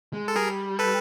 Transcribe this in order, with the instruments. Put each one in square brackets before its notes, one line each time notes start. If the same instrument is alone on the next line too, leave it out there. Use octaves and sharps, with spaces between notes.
[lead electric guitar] G#3
[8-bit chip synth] A4
[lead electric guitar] G3 [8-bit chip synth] G#4 A#4
[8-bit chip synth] A4 B4